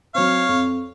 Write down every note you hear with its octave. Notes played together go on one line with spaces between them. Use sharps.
F#3 C4 C#5 F5
F2